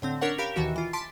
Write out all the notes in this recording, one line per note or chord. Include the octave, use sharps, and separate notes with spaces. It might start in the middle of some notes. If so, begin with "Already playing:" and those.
A2 D3 C4
C#4 D4 A#4 C#5 F#5
G4 A#4 F5 B5
D#2 B2 D#3 E3 F#4 E5
E3 F4
A5 C6 D6 A6 B6 D7